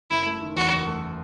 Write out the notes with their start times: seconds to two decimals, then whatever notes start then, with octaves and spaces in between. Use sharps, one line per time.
0.10 F#1 E4
0.26 A3
0.41 D#3
0.56 E2 F#4
0.72 F#1
0.87 A3